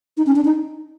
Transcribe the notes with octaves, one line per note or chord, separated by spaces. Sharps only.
D#4
C#4
D4
D#4